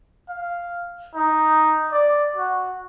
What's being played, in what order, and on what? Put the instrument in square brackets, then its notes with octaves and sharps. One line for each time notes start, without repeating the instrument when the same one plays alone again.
[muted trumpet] F5
D#4
D5
F#4